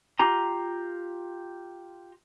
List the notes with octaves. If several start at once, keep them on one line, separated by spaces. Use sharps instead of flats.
F4 G4 A#5